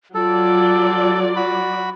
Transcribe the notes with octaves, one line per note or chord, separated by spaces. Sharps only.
F#3 F4 A4 D5
F#4 B5